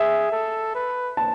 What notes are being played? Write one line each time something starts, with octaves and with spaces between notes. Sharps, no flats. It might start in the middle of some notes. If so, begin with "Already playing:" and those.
Already playing: G#4 E5
A4
B4
A5